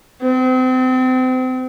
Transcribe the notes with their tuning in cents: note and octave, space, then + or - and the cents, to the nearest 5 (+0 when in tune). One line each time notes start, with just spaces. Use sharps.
C4 -35